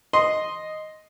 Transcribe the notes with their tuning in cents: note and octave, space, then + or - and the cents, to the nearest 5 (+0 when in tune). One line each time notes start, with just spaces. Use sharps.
D#5 +0 C6 +0